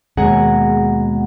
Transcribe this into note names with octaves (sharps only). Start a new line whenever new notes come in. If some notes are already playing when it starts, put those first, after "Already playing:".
D#2 B2 G#3 G#4 F#5 A#5